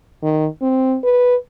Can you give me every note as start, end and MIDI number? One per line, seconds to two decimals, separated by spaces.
0.23 0.47 51
0.62 0.97 60
1.04 1.36 71